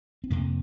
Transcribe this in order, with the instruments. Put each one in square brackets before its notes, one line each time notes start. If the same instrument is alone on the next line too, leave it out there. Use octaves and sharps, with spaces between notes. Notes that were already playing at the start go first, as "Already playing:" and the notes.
[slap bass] C4
F2 C3 A#3